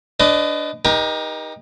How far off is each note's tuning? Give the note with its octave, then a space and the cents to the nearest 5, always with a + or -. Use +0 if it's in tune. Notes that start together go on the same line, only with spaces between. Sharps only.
D4 -10 B4 +35 D#5 +0
D#4 +0 G4 +25 A#4 +40